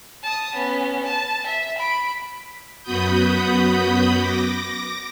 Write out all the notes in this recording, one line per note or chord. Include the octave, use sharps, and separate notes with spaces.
A5 D#6
B3 C#4
A5
E5
B5 D7
F#2 B3 F#4 B5 D#6 G6
D6 A#6